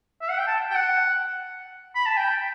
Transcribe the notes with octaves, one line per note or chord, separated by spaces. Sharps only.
E5
F#5
G5
A5
G5
F#5
B5
A5
G5